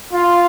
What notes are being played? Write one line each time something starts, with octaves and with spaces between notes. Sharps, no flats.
F4